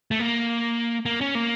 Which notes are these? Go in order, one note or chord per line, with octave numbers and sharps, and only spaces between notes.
A3
A#3
A#3
C#4
A#3